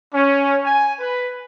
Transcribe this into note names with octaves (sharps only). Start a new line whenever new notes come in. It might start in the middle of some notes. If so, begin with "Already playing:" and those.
C#4
G#5
B4